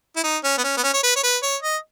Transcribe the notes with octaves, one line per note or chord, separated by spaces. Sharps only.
E4
D#4
C#4
B3
C#4
B3
C#4
C#5
B4
C#5
B4
C#5
D#5